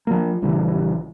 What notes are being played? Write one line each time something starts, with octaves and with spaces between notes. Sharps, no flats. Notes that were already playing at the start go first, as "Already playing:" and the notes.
F3 A#3
A#1 C#3 E3 G3